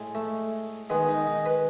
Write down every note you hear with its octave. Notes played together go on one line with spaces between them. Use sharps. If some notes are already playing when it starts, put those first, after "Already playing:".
Already playing: A2 G#3
A3
D#3 G#3 B3
D#4
D#4
B4